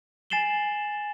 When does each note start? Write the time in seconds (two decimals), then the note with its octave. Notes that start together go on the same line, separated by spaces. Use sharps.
0.30 G#5 A6 C7 E7 F#7 G7